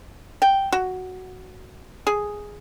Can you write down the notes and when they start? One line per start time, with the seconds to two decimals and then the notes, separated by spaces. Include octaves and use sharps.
0.42 G5
0.72 F#4
2.07 G#4